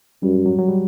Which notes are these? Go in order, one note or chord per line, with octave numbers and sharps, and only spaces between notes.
F#2 G3
F#3
F#3
G3